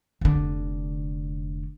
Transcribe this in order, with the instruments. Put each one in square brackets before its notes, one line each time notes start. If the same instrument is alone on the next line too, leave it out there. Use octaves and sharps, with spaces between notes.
[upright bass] F1 D3